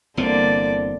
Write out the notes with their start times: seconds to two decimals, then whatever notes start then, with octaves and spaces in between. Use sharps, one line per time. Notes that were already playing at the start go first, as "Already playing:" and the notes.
0.17 G1 D3 E3 A#3 C4 D5